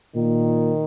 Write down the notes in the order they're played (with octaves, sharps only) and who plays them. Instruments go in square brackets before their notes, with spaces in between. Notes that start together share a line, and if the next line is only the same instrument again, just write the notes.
[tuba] A#2 [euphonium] D#3